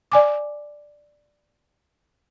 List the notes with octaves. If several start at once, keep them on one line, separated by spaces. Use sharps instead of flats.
D5 G#5 D6